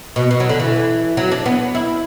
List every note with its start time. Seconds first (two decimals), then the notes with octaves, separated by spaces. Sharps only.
0.16 B2
0.31 B2
0.40 F#3
0.49 D3
0.60 E3
1.17 F#3
1.32 D4
1.46 B3
1.75 E4